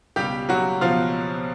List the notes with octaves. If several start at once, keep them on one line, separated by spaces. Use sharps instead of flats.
C#2 B2 G3 G4
F#3 F#4
C#2 B2 F3 F4